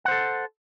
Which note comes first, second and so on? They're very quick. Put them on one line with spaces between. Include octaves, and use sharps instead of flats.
F#5 C5 A4